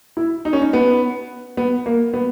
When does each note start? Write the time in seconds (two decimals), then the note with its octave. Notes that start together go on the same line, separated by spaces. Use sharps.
0.17 E4
0.45 D#4
0.53 C#4
0.61 D#4
0.73 B3
1.57 B3
1.86 A#3
2.14 B3